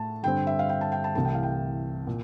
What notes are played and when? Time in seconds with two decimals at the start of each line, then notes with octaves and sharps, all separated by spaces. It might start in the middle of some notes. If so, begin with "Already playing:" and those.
Already playing: A2 A3 A5
0.23 G2 D3 G3 C4 G5
0.47 E5
0.59 F5
0.69 G5
0.81 A5
0.92 G5
1.04 A5
1.15 C2 C3 E3 A3 A5
1.25 G5
1.35 F5
1.43 G5
2.07 A#2